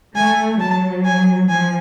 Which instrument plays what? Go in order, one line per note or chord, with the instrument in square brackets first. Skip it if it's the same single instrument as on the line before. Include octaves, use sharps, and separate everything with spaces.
[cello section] A3 [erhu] G#5
[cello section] F#3 [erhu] A5
[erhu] G#5
[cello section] F3 [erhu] G#5